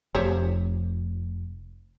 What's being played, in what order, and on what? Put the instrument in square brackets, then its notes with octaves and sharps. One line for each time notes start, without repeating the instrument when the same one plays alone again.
[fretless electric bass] F1 [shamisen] G4 C5 C#5